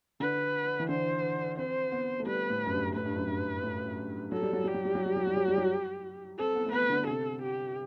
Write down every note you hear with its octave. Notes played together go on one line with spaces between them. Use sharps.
D3 B4
E3
D3 C5
C4 C5
B3
A3
G3 B4
A2
F#2
G2
A2 B4
G2
F#2
G2
A2
F#3 A4
G3
F#3
G3 G4
F#3
G3
F#3
G3
F#3
G3
F#3
G3
F#3
C4 A4
B3
A3
B3 B4
D3
C3 A4
G4